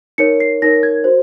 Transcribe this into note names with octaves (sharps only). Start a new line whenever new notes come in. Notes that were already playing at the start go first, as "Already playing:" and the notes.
D#4 A#4 C#5 C#7
C7
D#4 A#4 C#5 A#6
G#6
F#4 C5